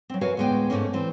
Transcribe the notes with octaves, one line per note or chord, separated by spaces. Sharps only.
F#3 C4
F#4 A#4 B4 C#5 F5 G#5
D2 A2 G#3 B3 G5 G#5
G#2 A3 A#3 C#4
E3 C4